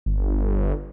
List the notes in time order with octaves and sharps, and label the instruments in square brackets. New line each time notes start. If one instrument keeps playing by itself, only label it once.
[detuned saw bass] G1